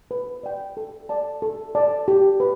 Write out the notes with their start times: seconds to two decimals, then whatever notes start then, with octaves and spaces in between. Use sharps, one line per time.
0.11 B4
0.43 D5 G5
0.77 A4
1.09 D5 A5
1.42 A4
1.75 D5 A5
2.08 G4
2.40 B4